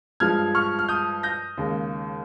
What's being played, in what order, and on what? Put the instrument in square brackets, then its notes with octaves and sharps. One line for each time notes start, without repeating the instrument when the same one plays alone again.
[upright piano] G2 F3 G#3 F6 G#6
C#6 F6
F6
D#6 G6
G6 A#6
D#2 C#3 G#3